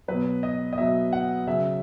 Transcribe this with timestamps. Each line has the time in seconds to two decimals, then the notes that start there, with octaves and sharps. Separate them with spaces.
0.08 B2 F#3 B4
0.43 D#5
0.73 D#5
0.78 B2 F#3 E5
1.13 F#5
1.47 C#3 F#3 E5